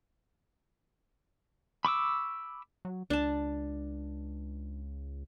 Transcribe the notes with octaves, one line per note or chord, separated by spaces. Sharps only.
B5 C#6 D6 E6
F#3
C#2 D4 A5